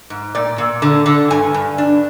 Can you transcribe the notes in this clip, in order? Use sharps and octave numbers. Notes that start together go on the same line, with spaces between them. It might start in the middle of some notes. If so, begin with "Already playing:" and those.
G#2
A#2 D5
A#2
D3
D3
G2 G#5
G2
D4